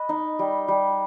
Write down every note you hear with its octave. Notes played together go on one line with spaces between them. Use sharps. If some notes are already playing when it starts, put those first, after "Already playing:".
Already playing: B4 D#5
D#4
G3
G3